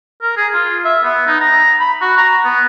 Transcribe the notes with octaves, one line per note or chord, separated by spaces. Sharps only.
A#4
G#4
F4
E5
B3
D#4
A#5
B5
F#4
A#5
B3